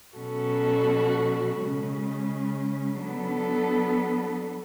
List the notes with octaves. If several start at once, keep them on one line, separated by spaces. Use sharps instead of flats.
B2 F#3 C#4 F#4 A4
C#3 G#3 C#4
F#3 B3 D4 A4